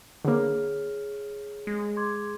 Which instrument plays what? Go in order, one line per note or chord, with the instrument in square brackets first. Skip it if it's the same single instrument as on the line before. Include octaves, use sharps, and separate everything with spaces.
[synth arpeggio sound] D3 A#3 [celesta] G#4 C#5 F6
[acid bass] G#3
[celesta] C6 D6 G#6